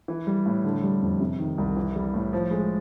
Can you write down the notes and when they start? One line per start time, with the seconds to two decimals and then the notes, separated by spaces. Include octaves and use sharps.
0.08 E3
0.27 G3
0.46 A2
0.64 D3
0.83 G3
1.02 F2
1.20 C3
1.39 D#3
1.58 C2
1.77 E3
1.95 G3
2.14 A2
2.33 F3
2.51 G#3